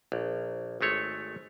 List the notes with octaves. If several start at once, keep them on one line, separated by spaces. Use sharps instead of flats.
A#1
G#1 G#3 A3 C#5